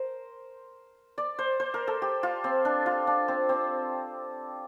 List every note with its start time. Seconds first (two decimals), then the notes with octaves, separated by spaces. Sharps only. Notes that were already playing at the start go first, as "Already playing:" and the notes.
Already playing: A#4 C5
1.18 D5
1.39 C5
1.60 C5
1.74 A#4
1.87 A4
2.02 G4
2.23 F4
2.44 C4
2.65 D4
2.86 F4
3.07 D4
3.28 C4
3.49 C4